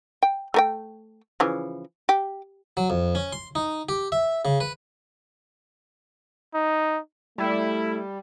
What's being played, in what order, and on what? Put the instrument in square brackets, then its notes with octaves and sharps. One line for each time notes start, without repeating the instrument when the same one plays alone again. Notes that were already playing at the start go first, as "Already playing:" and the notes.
[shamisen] G5
A3 A#4 G5
C#3 E3 F3
G4
[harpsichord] F#3
F2
C#4
C6
D#4
G4
E5
C#3
B4
[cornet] D#4
[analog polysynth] G3 [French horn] A3 [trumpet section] E4